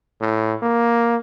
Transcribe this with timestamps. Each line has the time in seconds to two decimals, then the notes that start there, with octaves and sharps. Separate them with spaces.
0.21 A2
0.63 A#3